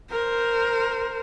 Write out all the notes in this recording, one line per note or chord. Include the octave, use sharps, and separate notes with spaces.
A#4 C5